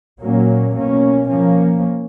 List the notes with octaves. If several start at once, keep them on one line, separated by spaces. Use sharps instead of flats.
A#2 F#3 A#3 C#4
B2 A#3 C#4
F3 A#3 C#4